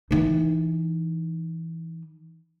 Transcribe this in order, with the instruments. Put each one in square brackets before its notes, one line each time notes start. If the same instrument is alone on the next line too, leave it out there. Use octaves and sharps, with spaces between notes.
[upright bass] E3 D#4